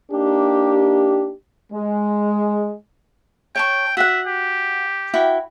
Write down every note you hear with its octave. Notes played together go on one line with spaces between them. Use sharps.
A#3 D4 D#4 G4
G#3
C#5 G5 A5 C#6
F#4 E5 F#5
G4
E4 F#4 G5